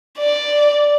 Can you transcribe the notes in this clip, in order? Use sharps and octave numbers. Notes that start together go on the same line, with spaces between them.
D5